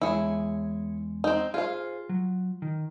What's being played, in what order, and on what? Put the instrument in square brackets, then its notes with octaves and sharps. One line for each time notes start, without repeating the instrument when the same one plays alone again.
[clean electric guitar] E2 G#3 C#5 [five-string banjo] E4 G#4
[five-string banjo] C4 D#4
[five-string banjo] F4 F5 [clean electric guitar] G#4 C5
[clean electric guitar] F#3
D#3